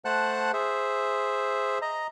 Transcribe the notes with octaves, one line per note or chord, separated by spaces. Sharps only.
A3 C5 F#5 A5 F#6
G#4 C5 E5
D#5 A#5